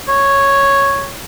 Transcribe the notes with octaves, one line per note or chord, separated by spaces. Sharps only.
C#5